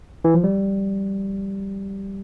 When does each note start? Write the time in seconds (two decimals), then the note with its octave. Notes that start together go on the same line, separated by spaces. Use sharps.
0.25 E3
0.34 F3
0.44 G3